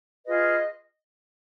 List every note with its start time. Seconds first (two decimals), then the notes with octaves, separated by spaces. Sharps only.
0.24 F4 G#4 B4 D#5